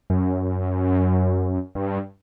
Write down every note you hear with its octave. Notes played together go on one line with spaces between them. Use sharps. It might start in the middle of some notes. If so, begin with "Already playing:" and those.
F#2
G2